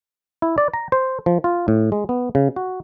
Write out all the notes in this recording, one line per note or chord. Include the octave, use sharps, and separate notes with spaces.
E4
D5
A#5
C5
F3
F4
A2
G#3
B3
C#3
F#4